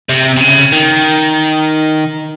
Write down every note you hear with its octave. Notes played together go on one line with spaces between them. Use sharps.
C3
C3
C#3
D#3